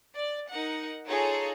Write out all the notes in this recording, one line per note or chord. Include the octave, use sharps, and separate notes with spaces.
D5
D#4 A#4 F#5
D#4 F4 G#4 A4 C#5 A#5